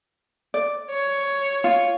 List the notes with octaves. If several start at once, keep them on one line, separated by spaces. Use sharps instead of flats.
D5
C#5
F4